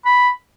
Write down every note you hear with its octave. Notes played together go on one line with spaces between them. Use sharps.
B5